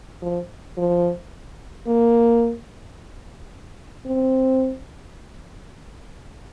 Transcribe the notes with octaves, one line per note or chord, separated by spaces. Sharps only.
F3
F3
A#3
C4